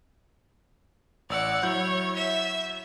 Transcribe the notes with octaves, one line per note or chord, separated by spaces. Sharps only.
A1 D5 F#5 E6
F#3 E4 C#5 G6
E5 B6